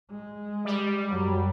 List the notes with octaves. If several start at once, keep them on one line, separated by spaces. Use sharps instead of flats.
G#3
G3
F#2 F#3